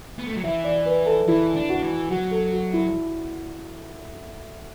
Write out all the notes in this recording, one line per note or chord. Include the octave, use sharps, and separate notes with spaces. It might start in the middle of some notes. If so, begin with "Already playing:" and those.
B3
A3
F#3
E3 E5
D5
B4
A4
E3 E4
D4
F#4
E3
F#3 F#4
A4
F#4
E4